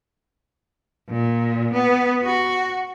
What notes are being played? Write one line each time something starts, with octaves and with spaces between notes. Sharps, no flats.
A#2
B3
F#4